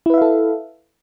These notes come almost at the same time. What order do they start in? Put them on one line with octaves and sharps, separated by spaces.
E4 B4 E5 F5 A4